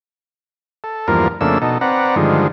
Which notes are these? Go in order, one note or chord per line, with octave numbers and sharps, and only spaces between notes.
A4
E2 G2 F3 A#3 A#4
F2 C#3 A3 A#3 D4 E6
B2 D#4 A4
C4 B4 D5 F#5 A#5
G2 D3 D#3 F3 G#3